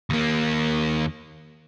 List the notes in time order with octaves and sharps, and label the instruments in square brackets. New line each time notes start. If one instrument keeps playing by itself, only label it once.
[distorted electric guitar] D#2 A#3